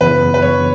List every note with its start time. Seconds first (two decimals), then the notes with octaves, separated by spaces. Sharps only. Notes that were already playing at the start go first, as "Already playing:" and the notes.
0.01 F#2 C#3 E3 B3 B4
0.34 B4
0.42 C#5